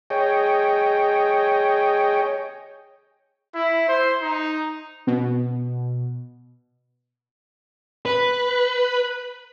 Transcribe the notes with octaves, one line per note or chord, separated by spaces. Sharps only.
G#4 C#5 D#5 G5
E4
C5
D#4
B2
B4